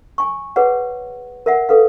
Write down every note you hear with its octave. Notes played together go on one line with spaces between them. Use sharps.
G#5 C#6
G#4 B4 C#5 F#5
A#4 E5 F#5
G#4 A4 B4 F5